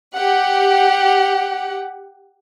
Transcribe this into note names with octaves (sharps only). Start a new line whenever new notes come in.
G4 F#5